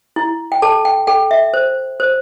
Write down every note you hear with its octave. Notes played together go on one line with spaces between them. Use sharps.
E4
G5
A4 A5
G5
A4 G5
E5
C5
C5